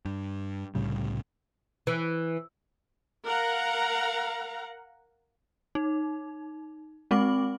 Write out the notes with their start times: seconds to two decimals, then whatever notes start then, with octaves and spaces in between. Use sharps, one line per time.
0.05 G2
0.75 C2 A2 C#3 G3
1.87 E3
3.25 A#4 F5 F#5 A#5
5.75 D#4
7.11 G#3 C4 D6 F#7